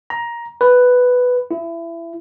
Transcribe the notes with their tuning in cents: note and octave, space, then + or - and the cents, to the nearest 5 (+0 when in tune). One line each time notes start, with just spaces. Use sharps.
A#5 +15
B4 +5
E4 +25